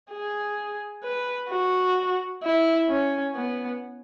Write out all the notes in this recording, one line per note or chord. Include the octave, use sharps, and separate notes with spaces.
G#4
B4
F#4
E4
C#4
B3